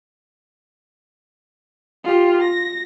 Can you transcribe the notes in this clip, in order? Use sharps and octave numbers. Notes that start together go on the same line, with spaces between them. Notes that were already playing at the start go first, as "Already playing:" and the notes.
F4 G4
A#6